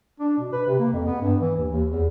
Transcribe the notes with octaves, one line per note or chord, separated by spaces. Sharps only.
D4
B2
B4
C3
A#3
F2
B3
G2
E3
D#2
D#2
E2